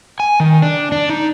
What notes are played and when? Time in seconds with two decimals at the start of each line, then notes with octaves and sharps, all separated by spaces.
0.20 G#5
0.40 D#3
0.62 D4
0.92 D4
1.10 D#4